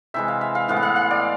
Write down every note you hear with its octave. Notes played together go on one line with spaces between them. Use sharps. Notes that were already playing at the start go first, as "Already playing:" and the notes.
C3 E3 G#3 E5
F5
E5
F5
A2 E3 G#3 B3 F5
F#5
F5
F5
D5